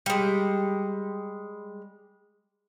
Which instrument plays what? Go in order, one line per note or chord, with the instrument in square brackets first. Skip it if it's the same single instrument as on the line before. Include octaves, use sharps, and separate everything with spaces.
[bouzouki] G3 G#3